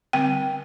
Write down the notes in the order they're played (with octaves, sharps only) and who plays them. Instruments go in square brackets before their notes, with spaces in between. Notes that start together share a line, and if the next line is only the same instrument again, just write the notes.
[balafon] D3 G3 C4 G5